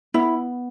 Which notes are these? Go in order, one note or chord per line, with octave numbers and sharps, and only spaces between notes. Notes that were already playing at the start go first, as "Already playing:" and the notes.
B3 E4